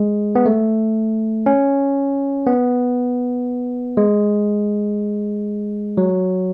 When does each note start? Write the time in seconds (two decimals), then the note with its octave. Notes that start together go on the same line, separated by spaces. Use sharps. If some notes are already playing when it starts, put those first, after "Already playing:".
Already playing: G#3
0.35 B3
0.46 A3
1.46 C#4
2.47 B3
3.97 G#3
5.97 F#3